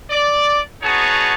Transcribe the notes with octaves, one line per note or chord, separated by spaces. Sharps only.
D5
B3 D#4 F#4 G#4 C#5 A5